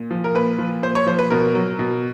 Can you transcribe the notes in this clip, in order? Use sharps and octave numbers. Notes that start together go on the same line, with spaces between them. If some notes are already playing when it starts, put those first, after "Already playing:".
Already playing: A#2
F3
A#4
A#2 B4
F3
A#2 C5
C#5
F3 C5
B4
B2 A#4
F#3
B2